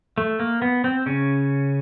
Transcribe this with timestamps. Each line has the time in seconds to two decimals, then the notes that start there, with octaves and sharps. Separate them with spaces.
0.18 A3
0.39 A#3
0.62 B3
0.84 C4
1.06 C#3 C#4